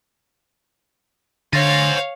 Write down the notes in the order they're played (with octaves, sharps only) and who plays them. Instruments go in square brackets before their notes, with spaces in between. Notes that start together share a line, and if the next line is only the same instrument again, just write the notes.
[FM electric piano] D3 A6 A#6 [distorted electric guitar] C5 G#5 [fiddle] C#5 F5